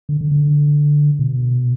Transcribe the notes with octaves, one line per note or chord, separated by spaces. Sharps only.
D3
D3
D3
B2